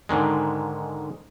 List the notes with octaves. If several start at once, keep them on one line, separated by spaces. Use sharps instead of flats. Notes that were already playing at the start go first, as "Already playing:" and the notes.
G#2 D3 D#3 G#3